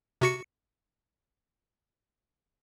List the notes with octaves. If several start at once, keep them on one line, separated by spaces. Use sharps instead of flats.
C3 F#4 C#7